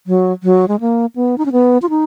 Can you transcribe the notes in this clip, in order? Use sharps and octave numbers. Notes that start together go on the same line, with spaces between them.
F#3
F#3
G#3
A#3
B3
D#4
C#4
B3
F4
D#4